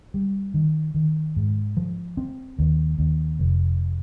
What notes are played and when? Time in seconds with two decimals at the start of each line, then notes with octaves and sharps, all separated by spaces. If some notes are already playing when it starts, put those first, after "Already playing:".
0.14 G3
0.54 D#3
0.94 D#3
1.36 G#2
1.77 F3
2.17 C4
2.59 D#2
2.99 D#2
3.39 F1